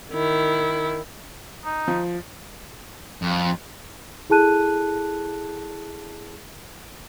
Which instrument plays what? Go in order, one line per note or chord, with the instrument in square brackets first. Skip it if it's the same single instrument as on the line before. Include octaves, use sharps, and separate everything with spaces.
[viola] D#3 E4
[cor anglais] D#4
[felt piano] F3
[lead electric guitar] F2
[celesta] E4 G#4 A4 A5 F#6 D#7